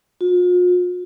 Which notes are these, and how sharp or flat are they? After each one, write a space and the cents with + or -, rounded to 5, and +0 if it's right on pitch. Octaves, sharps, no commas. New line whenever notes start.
F4 +45